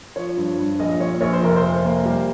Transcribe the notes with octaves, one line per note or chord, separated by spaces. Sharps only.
F3 C#5
G2
G2
A#1 D#5
A#2 C#5
A#1 C#5
C5
F1 A#4
C5
F1
A#3
G3